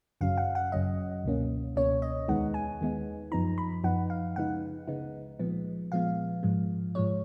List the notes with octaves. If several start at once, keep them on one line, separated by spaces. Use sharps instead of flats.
G#1 F#2 C#3 F#3 C#4 F5
F#5
F#5
G#1 F#2 C#3 F#3 C#4 D#5
C#2 B2 A#3 C#4
C#2 B2 A#3 C#4 C#5
D#5
D#2 D#3 G#3 B3 D#4 F#5
G#5
D#2 D#3 G#3 B3 D#4
F#2 F3 B3 D#4 A#5
B5
F#2 F3 B3 D#4 F#5
F5
C#2 C#3 G#3 B3 D#4 F#5
C#2 C#3 G#3 B3 D#4
A#2 F3 G#3 B3
A#2 F3 G#3 B3 F5
G#2 F3 G#3
G#2 F3 G#3 C#5